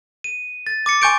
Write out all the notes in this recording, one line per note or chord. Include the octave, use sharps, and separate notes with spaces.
D#7
A6
D6 A6 C#7
G#5 C6 C#6 G6 C#7 D7